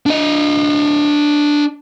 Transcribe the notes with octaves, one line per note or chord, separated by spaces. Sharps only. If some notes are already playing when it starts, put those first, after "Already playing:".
D4 D#5